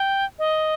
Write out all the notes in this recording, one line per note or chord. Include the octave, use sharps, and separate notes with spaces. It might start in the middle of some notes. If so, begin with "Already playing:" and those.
Already playing: G5
D#5